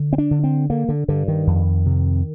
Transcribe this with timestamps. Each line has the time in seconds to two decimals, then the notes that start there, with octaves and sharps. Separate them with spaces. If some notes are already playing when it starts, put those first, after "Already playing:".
Already playing: D3
0.13 C4
0.18 D4
0.31 D3
0.44 C4
0.70 D3 A#3
0.89 D3
1.08 G2 D3
1.28 D#3
1.47 F2
1.86 C3